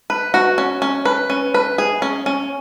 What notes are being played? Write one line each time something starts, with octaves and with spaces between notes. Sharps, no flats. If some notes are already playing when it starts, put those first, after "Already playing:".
B4
F#4
C#4
C#4
B4
C#4
B4
G#4
C#4
C#4